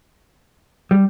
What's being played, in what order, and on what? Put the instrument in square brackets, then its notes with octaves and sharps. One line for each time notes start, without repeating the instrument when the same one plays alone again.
[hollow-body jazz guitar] G3